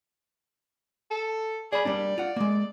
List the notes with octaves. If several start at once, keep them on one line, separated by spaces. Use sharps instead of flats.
A4
G#4 D5 B5
G3 A#3 D4 D5
F4 F#5
G#3 A#3